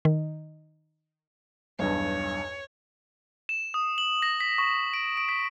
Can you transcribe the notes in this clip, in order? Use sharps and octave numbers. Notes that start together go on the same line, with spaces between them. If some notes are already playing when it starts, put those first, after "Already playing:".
D#3
B1 E2 G2 C#5
E7
D#6
F#7
A#6
B6
C#6
D7
D7
B6